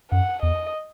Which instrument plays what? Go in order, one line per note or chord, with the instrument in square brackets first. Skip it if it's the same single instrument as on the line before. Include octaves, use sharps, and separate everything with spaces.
[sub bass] F#2 [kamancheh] F#5
[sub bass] E2 [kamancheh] D#5